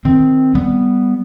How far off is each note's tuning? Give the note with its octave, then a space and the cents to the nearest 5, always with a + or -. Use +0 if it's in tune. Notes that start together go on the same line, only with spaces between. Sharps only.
D#3 +0 C4 +0
G3 +0 B3 +0